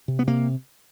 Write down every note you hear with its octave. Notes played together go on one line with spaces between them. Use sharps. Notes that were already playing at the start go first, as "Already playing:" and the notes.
C3
B3
C3 A#3